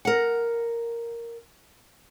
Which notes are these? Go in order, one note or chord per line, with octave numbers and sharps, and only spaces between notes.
A#4 F#5